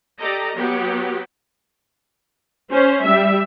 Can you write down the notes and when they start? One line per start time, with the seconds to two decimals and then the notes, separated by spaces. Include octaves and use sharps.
0.20 G4 A4 D5 D#5 A#5
0.53 F#3 B3 G4
2.72 C#4 C5
3.03 G3 E5